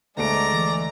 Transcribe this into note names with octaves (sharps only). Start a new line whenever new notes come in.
D2 G#3 A3 D5 A#5 D7
E3